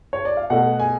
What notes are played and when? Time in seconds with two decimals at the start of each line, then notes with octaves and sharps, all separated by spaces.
0.13 C#5
0.25 D5
0.37 F5
0.50 B2 A3 F#5
0.80 G#5